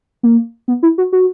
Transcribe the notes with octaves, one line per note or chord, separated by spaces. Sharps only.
A#3
B3
E4
F#4
F#4